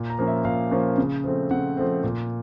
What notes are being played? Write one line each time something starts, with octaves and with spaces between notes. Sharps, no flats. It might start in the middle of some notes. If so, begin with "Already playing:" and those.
Already playing: A#2
A#5
F3 A#3 C#4
E5
A#2 F5
F3 A#3 C#4
C#3
F3 A3 C4
C#3 F#5
F3 A3 C4
A#2